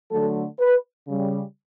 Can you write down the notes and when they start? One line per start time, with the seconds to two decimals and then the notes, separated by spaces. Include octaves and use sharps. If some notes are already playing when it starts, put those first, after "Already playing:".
0.11 D3 F#3 A3 A4
0.60 B4
1.08 C#3 G3